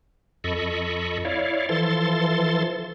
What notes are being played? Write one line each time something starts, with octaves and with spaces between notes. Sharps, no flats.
F2 A4 D#5 B5 C#6
E4 C#5 D5 F5
E3 F3 A4 C6 A6